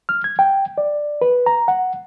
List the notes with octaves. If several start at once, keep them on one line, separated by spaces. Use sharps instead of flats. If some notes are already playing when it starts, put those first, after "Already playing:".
F6
G#6
G5
D5
B4
A#5
F#5